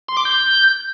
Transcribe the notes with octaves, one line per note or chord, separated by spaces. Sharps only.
C6
D6
G6